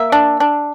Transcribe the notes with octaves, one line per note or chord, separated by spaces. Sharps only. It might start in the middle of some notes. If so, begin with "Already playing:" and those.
Already playing: A#3 E5
D4
D4